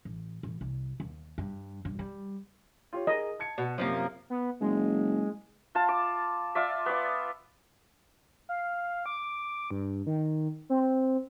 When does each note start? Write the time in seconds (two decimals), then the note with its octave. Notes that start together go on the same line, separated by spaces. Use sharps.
0.05 A1
0.43 A1
0.61 C2
1.00 D#2
1.38 G2
1.85 G2
1.99 G3
2.93 F4 G4 C#5
3.07 G#4 A#4 D#5
3.39 A5 G#6 C#7
3.58 B2
3.78 F#2 C3 F3 A3 A#3
4.30 B3
4.60 F#1 G#3
5.75 F4 A5
5.89 D6
6.55 F4 D5 E5
6.86 B3 D5
8.49 F5
9.06 D6
9.71 G2
10.06 D#3
10.70 C4